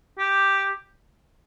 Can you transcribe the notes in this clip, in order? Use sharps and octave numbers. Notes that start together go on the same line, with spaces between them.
G4